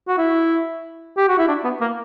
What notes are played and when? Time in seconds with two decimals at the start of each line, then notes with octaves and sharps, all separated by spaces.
0.08 F#4
0.18 E4
1.17 G4
1.28 F#4
1.38 E4
1.48 D4
1.64 B3
1.81 A#3